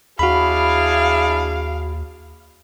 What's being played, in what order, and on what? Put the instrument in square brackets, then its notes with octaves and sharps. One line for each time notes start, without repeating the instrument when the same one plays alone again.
[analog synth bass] D#2 [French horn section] D4 E4 G#4 [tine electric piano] F#4 B5 [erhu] F5